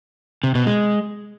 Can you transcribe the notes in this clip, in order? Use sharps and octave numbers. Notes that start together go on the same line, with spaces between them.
C3
B2
G#3